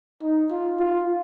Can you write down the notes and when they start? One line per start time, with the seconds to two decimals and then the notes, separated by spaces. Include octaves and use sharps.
0.22 D#4
0.51 F4
0.79 F4